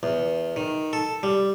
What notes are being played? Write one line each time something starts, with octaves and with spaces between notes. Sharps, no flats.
E2
D#3
A4
G3